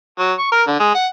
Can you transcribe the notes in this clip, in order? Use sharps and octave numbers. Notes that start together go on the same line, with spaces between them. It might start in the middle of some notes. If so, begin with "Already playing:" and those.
F#3
C#6
A#4
D3
G#3
F#5